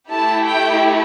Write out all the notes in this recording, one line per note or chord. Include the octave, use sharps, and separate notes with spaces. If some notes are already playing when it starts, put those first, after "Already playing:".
A3 E4 G4 A5
G5